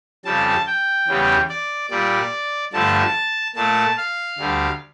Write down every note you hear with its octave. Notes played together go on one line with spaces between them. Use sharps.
F2 C#3 G3 A5
G5
E2 C#3 G3
D5
A#2 G3 D5
G2 D3 F3 A3 A5
A#2 A3 A5
F5
D2 D3 G3